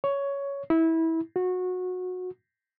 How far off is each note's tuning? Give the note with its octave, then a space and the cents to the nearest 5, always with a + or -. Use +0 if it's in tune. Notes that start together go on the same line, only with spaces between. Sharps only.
C#5 +10
E4 -20
F#4 -20